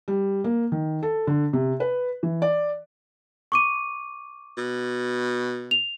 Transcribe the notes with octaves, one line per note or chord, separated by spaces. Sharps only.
G3
A#3
D#3
A4
D3
C3
B4
E3
D5
C#6 D6 D#7
B2
F7